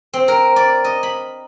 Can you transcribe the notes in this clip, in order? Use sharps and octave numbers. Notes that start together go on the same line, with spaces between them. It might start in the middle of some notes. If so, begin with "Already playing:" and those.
C4
A#4
D5
D#5
B5